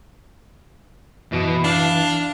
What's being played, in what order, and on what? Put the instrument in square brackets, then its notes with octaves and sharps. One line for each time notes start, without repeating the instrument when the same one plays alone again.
[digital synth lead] F#2 [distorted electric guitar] B2 [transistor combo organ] E3
[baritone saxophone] D4 [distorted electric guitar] F5